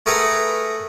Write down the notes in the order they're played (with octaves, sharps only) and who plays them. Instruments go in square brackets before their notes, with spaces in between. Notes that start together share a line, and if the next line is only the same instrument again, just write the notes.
[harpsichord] A3 G#4 A#4 B4 F#5